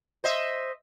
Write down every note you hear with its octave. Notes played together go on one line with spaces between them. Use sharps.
C5 D#5 E5